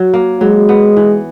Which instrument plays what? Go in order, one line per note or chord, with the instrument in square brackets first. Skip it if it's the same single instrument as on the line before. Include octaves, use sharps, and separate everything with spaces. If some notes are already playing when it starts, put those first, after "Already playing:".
Already playing: [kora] F#3
A#3
[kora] F#3 [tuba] G#3
[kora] B3
E3